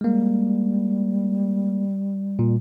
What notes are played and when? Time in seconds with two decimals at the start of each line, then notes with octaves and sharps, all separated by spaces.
0.01 G3 G#3 A#3
2.39 A#2